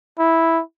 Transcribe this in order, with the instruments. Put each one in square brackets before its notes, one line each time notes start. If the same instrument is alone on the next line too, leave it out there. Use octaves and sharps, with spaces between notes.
[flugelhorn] E4